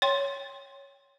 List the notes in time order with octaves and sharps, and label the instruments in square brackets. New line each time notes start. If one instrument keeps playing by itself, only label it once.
[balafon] C#5 G5 C6